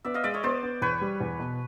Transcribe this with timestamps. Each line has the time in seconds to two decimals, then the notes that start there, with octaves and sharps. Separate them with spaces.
0.05 B3 D5 E5
0.14 D#5 F5
0.24 G#3 D5 E5
0.34 C#5 D#5
0.43 B3 C5 D5
0.63 B3
0.82 E2 B4 C#5
1.01 G3
1.20 E2
1.39 B2